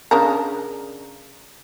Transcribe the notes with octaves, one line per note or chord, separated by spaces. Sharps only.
C#3 D4 A#4